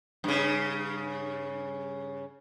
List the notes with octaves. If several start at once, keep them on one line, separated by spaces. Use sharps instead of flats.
G2 C#3